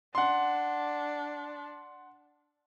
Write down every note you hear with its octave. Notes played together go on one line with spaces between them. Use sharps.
D4 F#5 C6